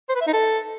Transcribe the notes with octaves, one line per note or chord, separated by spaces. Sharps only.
C5
B4
E5
D#4
A4